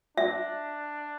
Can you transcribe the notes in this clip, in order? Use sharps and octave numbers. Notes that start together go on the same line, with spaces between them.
D4 E5